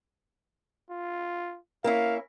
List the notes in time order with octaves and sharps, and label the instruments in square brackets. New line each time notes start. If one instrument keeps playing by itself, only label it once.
[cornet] F4
[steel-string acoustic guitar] A#3 C#4 E4 [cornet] F5